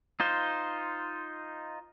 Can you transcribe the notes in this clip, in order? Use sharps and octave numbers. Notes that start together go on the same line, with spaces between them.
D#4 F4 C5